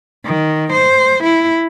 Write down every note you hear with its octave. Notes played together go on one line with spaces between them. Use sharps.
D#3
C5
E4